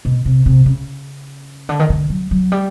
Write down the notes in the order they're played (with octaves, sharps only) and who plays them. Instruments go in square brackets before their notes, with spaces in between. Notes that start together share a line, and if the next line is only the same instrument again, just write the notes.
[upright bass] B2
C3
C3
C#3
D3
D#3
D3
F#3
F#3
G3